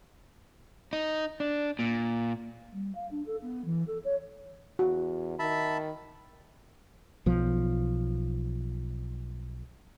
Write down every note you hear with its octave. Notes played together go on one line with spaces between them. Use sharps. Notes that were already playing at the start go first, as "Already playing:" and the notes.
D#4
D4
A#2
G3
F5
D4
A4
B3
E3
A4
C#5
E2 F#4
D#3 E5 A5 B5
B1 F3